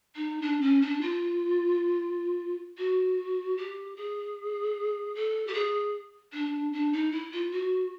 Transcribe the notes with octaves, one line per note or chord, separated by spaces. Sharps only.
D#4
D4
C#4
D4
F4
F#4
G4
G#4
A4
G4
G#4
D4
D4
D#4
E4
F4
F#4